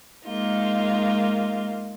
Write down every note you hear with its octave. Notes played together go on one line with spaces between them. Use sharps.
G#3 A#3 D#4 F4